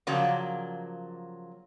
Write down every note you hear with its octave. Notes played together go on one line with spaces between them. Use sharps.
C#3 F3 F#3 A#3 D5